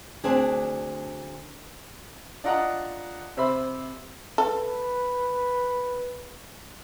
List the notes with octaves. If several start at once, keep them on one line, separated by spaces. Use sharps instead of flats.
D2 C4 D4 G#4
D4 F4 D#5 F#5 A#5
C3 C5 E5 B5
A4 B4